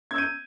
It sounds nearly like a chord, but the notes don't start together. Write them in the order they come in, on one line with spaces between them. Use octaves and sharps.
G#6 E6 G6 D#7